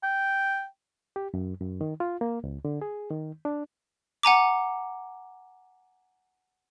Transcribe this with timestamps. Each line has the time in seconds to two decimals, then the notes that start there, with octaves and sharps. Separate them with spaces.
0.03 G5
1.16 G4
1.34 F#2
1.60 F#2
1.81 D#3
2.00 F4
2.21 A#3
2.44 C#2
2.65 D3
2.82 G#4
3.10 D#3
3.45 D4
4.23 F#5 G#5 A#5 D6